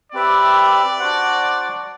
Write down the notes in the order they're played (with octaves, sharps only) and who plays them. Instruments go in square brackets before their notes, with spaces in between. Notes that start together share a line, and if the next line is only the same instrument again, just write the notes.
[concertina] C4 G4 B4 E5 [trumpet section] D5
[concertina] D4 F#4 C5 F#5